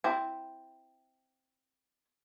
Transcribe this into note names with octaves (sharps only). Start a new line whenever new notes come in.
C4 E4